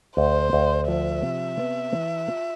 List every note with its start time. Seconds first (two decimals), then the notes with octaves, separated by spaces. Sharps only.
0.17 D2 C5
0.53 D2
0.88 F3 E5
1.23 C3
1.59 B3
1.95 E3
2.30 F4